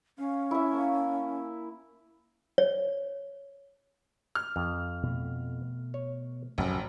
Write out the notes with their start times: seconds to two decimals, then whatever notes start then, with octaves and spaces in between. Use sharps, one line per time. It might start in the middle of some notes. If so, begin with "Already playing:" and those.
0.18 C#4 F5
0.51 E4 E5
0.72 A#3 A5 C#6
2.58 C#5
4.35 F6
4.56 F2
5.03 B2 A3
5.94 C#5
6.58 F1 C2 F#2 A2